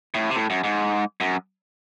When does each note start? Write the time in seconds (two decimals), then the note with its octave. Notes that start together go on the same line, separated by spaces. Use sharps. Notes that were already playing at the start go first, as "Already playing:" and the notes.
0.14 A2
0.30 C3
0.36 A2
0.50 F#2
0.64 G#2
1.21 F#2